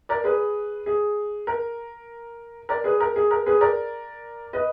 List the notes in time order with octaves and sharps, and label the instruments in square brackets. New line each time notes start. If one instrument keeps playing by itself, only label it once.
[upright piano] A#4 D5
G#4 B4
G#4
A#4
A#4 D5
G#4 B4
A#4
G#4
A#4
G#4 B4
A#4 D5
B4 D#5